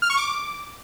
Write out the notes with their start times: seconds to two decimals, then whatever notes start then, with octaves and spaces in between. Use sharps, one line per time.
0.02 F6
0.10 C#6
0.17 D6